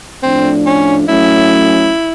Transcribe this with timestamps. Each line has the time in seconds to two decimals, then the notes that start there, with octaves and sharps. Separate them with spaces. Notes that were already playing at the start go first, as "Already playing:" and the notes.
0.23 A2 F3 A3 C4 D4
0.66 C#4
1.08 F#3 A3 C#4 E4